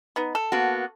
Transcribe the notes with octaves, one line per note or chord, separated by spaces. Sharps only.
B3 D#4
A4
A#3 B3 F#4